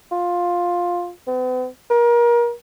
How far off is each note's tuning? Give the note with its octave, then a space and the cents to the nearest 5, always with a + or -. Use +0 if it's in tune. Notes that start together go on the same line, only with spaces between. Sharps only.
F4 +10
B3 +45
A#4 +30